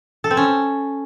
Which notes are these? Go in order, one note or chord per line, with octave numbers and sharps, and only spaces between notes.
A4
C4
C#4